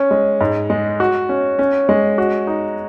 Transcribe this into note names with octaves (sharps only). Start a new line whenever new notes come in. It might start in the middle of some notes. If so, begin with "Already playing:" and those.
Already playing: C#4
G#3
G#2
G#3
F#4
C#4
C#4
G#3
F#4
D#4